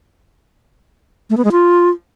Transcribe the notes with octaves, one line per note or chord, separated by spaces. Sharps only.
A3
B3
G#3
F4